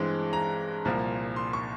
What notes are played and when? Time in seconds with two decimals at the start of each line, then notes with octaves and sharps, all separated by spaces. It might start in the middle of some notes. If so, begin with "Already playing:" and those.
Already playing: G2 E3 G#3 C4
0.33 A#5
0.85 C2 A#2 F3 A#3
1.36 C6
1.53 C#6